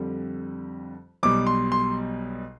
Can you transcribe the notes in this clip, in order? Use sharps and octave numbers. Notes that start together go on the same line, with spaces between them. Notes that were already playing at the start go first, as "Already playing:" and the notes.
Already playing: F2 D3 G3
B1 B2 G3 D6
C6
C6